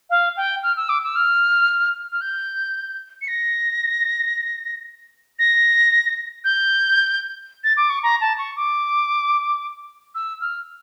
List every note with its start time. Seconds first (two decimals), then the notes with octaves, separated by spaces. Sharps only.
0.10 F5
0.37 G5
0.63 F6
0.77 E6
0.89 D6
1.03 E6
1.16 F6
2.12 F6
2.21 G6
3.21 C#7
3.28 A#6
5.39 A#6
6.44 G6
7.64 A6
7.77 D6
7.90 C#6
8.03 A#5
8.21 A5
8.38 C#6
8.56 D6
10.15 E6
10.41 F6